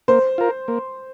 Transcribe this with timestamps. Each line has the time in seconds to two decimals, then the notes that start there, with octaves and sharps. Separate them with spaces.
0.08 A#3 C5
0.38 F4 A#4
0.68 A#3